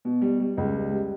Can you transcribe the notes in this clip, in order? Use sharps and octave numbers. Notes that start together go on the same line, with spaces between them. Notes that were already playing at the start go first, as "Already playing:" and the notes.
B2
G3
G3
C#2
G3
G3